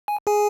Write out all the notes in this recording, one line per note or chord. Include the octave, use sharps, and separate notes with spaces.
G#5
G#4 G#5